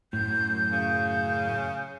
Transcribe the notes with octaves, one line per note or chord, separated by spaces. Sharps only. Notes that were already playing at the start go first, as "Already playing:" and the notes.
F#2 A2 G6
C#3